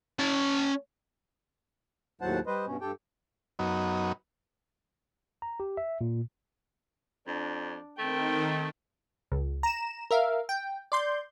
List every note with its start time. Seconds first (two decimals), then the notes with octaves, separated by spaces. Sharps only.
0.19 C#4 A5
2.21 D#2 A2 F#3 C5 F#5 A5
2.46 G3 B4 C5 D#5
2.66 G2 B2 C#4
2.81 G2 G4 A4 G5
3.59 F#2 F#3 B3 D#4
5.42 A#5
5.60 G4
5.77 E5
6.01 A#2
7.27 F2 D4
7.99 D#3 A3 C4 G5
9.32 C#2
9.63 A#5 E7
10.11 A#4 E5 F5
10.49 G5
10.92 D5 C6 G6